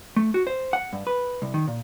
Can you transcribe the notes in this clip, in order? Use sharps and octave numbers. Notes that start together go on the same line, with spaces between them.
A3
F#4
C5
F#5
G2
B4
C2
D#3
A#2